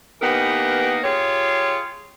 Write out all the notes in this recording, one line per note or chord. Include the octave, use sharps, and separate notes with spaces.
E3 A#3 B3 D#4 G4 A#4
F4 G4 G#4 C#5